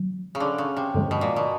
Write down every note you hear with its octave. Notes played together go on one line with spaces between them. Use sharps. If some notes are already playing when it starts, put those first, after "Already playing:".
Already playing: D#3 F#3
C#3
D3
C#3
C3
G2 D3 F3 G#3
B2
A#2
B2